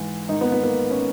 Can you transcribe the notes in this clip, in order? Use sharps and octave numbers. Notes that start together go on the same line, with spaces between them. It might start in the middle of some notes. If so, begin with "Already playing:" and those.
Already playing: G#2 E3
G#2 D#3 D#4
B3
B3
A#3
C#4